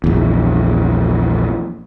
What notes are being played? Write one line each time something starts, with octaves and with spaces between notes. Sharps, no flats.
A#1 E2